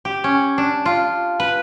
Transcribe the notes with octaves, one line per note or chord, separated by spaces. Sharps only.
G4
C#4
D4
F4
B4